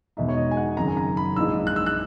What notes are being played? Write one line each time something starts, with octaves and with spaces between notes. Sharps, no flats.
E1 E2 B2 G#3 D#4 E5
C#5
D#5
G#5
F#5
G#1 F#2 C#3 A#5
G#5
A#5
B5
A#1 G#2 E3 G#3 E6
F#6
E6
F#6